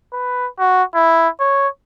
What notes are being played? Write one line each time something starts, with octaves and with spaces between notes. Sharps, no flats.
B4
F#4
E4
C#5